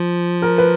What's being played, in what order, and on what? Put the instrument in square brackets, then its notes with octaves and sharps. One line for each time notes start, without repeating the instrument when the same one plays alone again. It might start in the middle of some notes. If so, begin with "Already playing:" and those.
Already playing: [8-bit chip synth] F3
[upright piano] A#4
B4